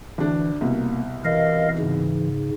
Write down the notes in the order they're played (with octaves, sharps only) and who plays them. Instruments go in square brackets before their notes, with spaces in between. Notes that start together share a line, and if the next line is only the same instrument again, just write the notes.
[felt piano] D2 D4 [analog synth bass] E3
[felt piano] C2 B2 [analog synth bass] A#3
[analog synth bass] E3 [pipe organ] A#4 D#5 F5
[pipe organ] G#2 C#3